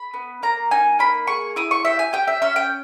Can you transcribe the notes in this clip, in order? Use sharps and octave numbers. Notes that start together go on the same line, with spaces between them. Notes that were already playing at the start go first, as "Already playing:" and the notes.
Already playing: B5
B3
A#3 A#5
D#4 G#5
A#3 B5
G#4 C#6
E4 D#6
C#6
G4 E5
G#5
G4 G5
E5
C#4 E5
G5